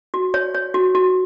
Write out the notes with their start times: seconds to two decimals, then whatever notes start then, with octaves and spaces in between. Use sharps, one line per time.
0.14 F#4
0.34 C#5
0.54 C#5
0.74 F#4
0.95 F#4